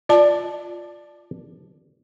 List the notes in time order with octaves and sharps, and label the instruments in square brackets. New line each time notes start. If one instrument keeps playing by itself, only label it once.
[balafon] F4 A5 [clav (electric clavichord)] D5